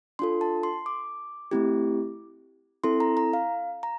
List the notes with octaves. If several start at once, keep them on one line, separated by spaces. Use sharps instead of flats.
D4 F4 A4 C6
A5
C6
D6
A3 C4 E4 G4
C4 E4 A4 C6
A#5
A#5
F5
A#5